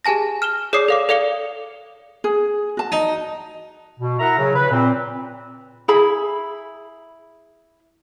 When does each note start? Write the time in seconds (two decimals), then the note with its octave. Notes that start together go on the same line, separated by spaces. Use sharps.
0.05 G4 G#4 G#5 A5 A#6
0.42 F6 E7 G7
0.73 G#4 C#5 D5 D6 D#6 C7
0.88 A4 F5 D6
1.09 A4 D5 F5 C#7 G7
2.24 G#4
2.77 F#4 A5
2.92 D#4
4.00 B2
4.19 E4 A#4 E5 F#5 A#5
4.38 C#3 F#3
4.56 B4
4.71 A#2 C4
5.88 E4 G#4 B5